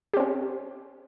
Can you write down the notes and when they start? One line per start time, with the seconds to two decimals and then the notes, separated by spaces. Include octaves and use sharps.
0.14 G4
0.17 C4
0.20 C#4